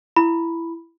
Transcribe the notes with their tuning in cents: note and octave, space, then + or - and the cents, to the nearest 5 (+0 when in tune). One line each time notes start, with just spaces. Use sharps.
E4 +15 B5 +0